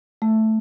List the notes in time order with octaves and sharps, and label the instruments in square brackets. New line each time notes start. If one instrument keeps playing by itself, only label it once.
[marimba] A3